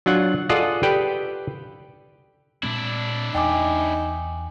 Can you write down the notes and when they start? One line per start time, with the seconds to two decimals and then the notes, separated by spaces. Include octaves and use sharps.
0.06 F#3 D4 F4 F#5
0.49 F4 G#4 A4 D5 D#5 F#5
0.83 G4 A4 B4 D5 G5
2.63 A#2 G#3 C4 D4 E4
3.35 E2 D#4 G5 G#5 D6